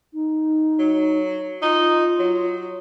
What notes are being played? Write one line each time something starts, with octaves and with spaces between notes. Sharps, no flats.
D#4
F#3
D#4 F4
F#3